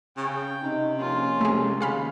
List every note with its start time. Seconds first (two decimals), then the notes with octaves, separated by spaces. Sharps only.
0.17 C#3 G5
0.63 C3 C#4 D#4
0.99 A#1 A#3 C#4 F4
1.41 C3 G#3 A3
1.80 D#2 C#3 G#4 F5 B5